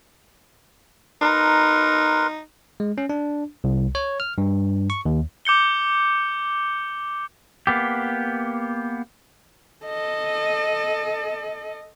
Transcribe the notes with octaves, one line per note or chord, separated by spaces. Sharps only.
D#4 A#4 B4 C6
G#3
C#4
D4
C2
C#5
F6
G2
C#6
D#2
D6 G6 C#7 G7
A#3 B3 G4
A4 D#5